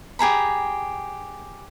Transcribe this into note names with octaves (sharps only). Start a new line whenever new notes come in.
G4 G#4 A#5 B5